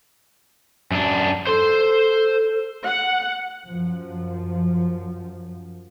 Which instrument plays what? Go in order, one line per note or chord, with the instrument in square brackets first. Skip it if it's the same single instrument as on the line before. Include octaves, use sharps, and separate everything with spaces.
[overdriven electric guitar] F#2 D4
[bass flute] A4 [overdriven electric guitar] C5 C6
[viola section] F#5
[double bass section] F#2 F3